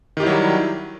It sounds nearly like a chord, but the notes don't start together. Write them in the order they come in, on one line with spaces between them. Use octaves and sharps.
D#3 G4 E4 F#3 G3